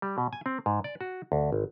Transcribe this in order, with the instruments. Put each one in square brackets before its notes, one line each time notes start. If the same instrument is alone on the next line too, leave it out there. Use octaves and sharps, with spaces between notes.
[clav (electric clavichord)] G3
B2
G#5
C4
G#2
D5
F#4
D2
G#1